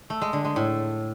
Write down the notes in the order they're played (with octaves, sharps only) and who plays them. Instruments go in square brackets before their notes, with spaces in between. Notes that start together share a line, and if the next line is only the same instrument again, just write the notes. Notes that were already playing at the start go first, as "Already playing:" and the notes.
[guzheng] A3
G#3
D3
G#3
A2